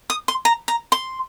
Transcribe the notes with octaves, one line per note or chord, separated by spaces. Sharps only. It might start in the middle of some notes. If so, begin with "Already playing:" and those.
D#6
C6
A#5
A#5
C6